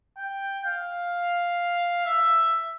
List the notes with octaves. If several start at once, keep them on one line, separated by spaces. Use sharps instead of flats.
G5
F5
E5